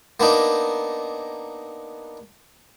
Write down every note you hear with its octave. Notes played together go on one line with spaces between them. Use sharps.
A#3 B3 D4 D#4